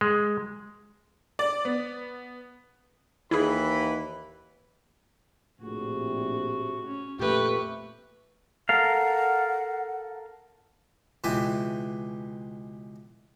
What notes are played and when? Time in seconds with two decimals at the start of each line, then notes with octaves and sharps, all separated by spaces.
0.01 G#3
1.39 D5
1.65 B3
3.31 D#2 E3 E4 G#4 B5
5.61 A#1 A2 C3 F#4 G#4
6.86 C#4
7.19 F2 A#2 A3 G4 B4 C#6
8.69 A4 A#4 F5 F#5
11.24 C#2 B2 E3 G4 E5 G#5